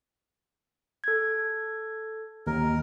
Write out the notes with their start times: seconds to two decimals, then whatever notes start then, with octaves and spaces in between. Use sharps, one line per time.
1.04 A4 G#6
2.47 D#2 A#4